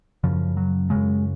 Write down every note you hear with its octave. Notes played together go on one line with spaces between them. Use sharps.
F#2 C#3 F3
F#3
F#2 C#3 G#3